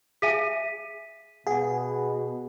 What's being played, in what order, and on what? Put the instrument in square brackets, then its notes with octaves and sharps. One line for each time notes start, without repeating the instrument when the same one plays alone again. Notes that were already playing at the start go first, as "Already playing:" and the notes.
[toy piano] G#4 E5 G#5 [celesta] B6 D#7
[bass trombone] B2 [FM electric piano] G#4 [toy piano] F#5